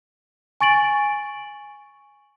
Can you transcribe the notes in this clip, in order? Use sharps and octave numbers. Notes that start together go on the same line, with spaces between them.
G#5 C#6 A6 D7 F#7